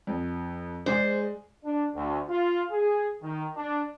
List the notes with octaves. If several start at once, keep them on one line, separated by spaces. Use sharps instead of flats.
F2
G#3 G#4 C5 D5
D4
D2
F4
G#4
D#3
D4